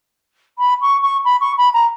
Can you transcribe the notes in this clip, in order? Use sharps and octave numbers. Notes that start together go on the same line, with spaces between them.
B5
C#6
C#6
B5
C#6
B5
A#5